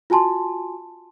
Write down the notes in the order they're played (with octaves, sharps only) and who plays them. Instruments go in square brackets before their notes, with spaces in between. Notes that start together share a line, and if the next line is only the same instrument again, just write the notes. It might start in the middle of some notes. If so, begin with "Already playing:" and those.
[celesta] F4 F#4 G#5 A5 C6